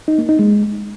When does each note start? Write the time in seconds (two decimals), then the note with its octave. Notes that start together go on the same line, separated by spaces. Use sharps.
0.08 D#4
0.18 A#3
0.29 D#4
0.39 G#3